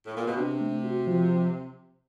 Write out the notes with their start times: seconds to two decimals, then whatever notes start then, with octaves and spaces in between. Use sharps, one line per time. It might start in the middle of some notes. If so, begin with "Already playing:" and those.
0.06 A2
0.16 A#2
0.26 B2
0.37 C3 D4
0.61 A3
0.84 F#4
1.07 F3